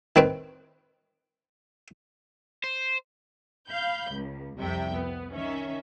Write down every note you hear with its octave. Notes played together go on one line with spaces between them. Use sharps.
D#3 C4 B4
C5
F5 B5 G6
C#2
C2 F2 C3 E5 G5
B3
D#3 C#4 E5